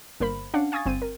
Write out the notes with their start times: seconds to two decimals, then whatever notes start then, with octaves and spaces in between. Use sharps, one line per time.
0.20 G1 A#3 A#4 C5 B5
0.54 C#4 D4 F5 F#5
0.72 F5 G#5 C#6 D#6 G#6 A6
0.86 G1 C4 D#7
1.02 A#4